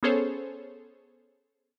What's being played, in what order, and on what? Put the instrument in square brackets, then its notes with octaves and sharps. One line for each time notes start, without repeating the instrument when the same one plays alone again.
[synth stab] B3 C#4 G#4 A4 C5 C#5